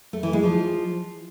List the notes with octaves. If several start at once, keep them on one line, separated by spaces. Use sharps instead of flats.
A3
E3
G#3
F3